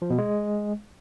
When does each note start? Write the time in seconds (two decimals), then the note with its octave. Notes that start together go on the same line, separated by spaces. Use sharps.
0.02 F3
0.10 B2
0.18 G#3